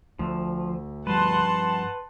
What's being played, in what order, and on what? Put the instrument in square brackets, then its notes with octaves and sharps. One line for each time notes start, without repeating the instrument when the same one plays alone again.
[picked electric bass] D2 [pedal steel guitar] F3
[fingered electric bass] G2 F3 G3 [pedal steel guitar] B4 [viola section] F#5 A5 C6